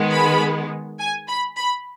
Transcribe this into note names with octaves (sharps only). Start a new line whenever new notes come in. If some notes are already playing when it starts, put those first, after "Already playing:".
Already playing: D#3 G#3 B3
B5
G#5
B5
B5